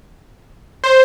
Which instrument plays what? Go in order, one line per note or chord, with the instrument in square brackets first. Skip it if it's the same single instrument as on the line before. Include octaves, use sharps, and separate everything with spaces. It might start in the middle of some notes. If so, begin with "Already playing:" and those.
[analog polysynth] C5